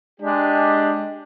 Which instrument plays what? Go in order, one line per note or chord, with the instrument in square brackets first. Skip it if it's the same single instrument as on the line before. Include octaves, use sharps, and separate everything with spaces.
[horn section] G#3 D4 G4